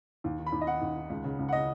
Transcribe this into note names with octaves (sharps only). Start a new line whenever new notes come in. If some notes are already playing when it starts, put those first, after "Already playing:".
D#2
D#3
B5
D#2
D#5
D#3 F#5
D#2
D#3
C#2
C#3
C#2
F#5
C#3 D#5